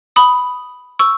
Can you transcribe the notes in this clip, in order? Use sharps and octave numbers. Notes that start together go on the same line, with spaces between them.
B5 D#6
C#6 E6